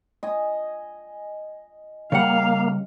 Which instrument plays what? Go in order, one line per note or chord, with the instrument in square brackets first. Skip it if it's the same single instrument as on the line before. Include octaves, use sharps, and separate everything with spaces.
[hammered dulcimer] D#5 G#5
[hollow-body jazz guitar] C#3 G3 F#5 [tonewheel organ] A#3 [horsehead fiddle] F5